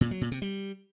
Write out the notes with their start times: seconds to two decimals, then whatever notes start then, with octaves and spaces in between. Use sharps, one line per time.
0.01 A#2
0.11 F#3
0.21 A#2
0.32 C3
0.42 G3